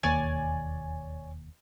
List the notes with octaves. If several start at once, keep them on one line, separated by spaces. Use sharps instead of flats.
E1 D#2 A#3 C#5 D5 G#5